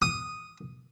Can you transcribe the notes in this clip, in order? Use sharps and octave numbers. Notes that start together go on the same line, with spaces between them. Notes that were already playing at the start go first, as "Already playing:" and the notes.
D#6